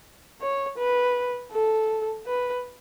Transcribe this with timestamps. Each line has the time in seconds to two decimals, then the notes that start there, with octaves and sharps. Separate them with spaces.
0.41 C#5
0.78 B4
1.52 A4
2.26 B4